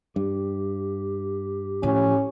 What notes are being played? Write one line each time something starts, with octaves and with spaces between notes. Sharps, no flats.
G2 G4
A2 F3 C#4